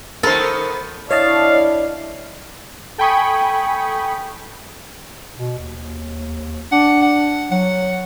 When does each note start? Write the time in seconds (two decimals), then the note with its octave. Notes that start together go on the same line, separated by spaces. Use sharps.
0.23 D#3 B3 A4 A#4 C5
1.11 D4 E4 C#5 D#5 F5 A5
2.98 A4 G5 G#5 B5 C#6 D#6
5.36 B2
5.59 D#2
6.72 D4 F#5
7.02 F#5
7.51 F#3 F#5